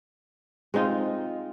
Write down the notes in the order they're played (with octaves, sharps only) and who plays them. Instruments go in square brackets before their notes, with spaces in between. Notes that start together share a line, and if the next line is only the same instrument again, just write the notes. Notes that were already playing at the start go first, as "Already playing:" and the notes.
[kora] G#3 C4 D#4 F4